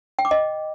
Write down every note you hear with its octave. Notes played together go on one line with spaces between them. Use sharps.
G5
D6
D#5